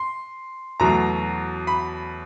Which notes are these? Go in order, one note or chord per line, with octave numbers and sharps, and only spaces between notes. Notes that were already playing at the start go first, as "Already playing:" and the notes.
Already playing: C6
E2 B2 F#3 A3 A#5
B5